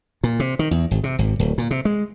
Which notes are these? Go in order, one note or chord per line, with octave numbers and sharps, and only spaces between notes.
A#2
C3
D#3
E2
G#1
C3
G#1
D1
A#2
C3
G#3